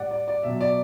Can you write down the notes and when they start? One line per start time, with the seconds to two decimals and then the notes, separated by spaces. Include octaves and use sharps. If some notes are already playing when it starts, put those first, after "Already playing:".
Already playing: A2 G3 D5 F#5
0.11 D5
0.28 D5
0.43 B2 F#3 E5
0.61 D5